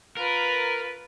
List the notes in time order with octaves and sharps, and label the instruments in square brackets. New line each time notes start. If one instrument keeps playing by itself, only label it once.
[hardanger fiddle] F4 B4 [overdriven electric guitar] A#4